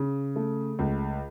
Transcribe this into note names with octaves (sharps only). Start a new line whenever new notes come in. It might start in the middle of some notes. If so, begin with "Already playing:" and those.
Already playing: C#3
A3
C#2